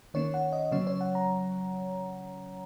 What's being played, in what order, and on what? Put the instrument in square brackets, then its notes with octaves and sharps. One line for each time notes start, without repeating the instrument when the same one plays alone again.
[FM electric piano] D#3 A#3 C#4 C#5
F#5
D#5
C#3 F#3 C#4 C#5
C#5
F#5
A#5